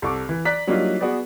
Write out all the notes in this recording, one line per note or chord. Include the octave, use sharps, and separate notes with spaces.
C2 A4 C#6 D6
E3
D5 A#5 F#6 B6
F#3 G3 A#3 D4 D#4 F4
B3 F#4 G#4 B4 D5